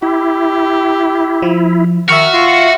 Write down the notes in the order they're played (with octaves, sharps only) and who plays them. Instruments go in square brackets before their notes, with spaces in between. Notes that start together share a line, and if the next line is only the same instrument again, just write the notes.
[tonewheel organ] E4 [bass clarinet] G4
[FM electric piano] F3
[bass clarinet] D#3 [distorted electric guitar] F#4 [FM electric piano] E5 C#6 F6
[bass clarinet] F4